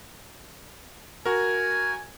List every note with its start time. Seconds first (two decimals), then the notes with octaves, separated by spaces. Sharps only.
1.26 F#4 A#4 G#5